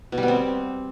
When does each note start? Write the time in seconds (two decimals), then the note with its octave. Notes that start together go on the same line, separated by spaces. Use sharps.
0.12 B2
0.18 G3
0.23 B3
0.28 C4